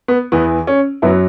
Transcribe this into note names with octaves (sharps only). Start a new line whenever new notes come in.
B3
E2 E3 B3
C#4
F#2 F#3 B3 E4